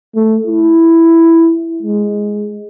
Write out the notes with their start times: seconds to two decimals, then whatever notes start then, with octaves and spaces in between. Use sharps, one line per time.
0.15 A3
0.47 E4
1.82 G#3